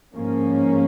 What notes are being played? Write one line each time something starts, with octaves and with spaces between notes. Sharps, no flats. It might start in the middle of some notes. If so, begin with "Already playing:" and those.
G#2 F3 A#3 C#4